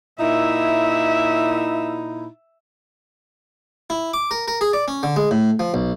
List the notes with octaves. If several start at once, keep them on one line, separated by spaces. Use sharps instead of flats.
A#2 D#4 E4 E5
E4
D6
A#4
A#4
G#4
D5
C#4
D3
G#3
A2
F3
B1